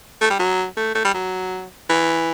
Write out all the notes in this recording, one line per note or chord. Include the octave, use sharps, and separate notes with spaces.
A3
G3
F#3
A3
A3
G3
F#3
E3